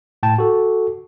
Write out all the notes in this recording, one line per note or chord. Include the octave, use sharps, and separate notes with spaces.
A2 G5 A5
F#4 A4